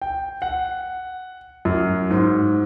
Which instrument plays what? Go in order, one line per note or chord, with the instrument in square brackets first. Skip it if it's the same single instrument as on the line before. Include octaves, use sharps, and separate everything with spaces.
[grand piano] G5
F#5
F#2
G#2